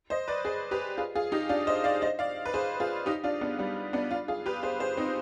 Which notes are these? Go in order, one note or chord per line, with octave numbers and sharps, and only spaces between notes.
C5 D#5
B4 D5
G#4 C5
G4 B4
F4 G#4
F4 G#4
D#4 G4
D4 F4
C5 D#5
D5 F5
C5 D#5
D5 F5
B4
G#4 C5
F4 G#4
D#4 G4
D4 F4
B3 D4
G3 B3
B3 D4
D4 F4
F4 G#4
G4 B4
G#4 C5
G#4 C5
C4 D#4